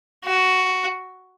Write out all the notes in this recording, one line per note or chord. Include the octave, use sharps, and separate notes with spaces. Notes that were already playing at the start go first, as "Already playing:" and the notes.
F#4